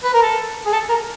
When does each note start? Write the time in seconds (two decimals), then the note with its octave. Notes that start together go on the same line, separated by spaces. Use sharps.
0.04 B4
0.14 A#4
0.23 A4
0.66 G#4
0.73 A4
0.89 A#4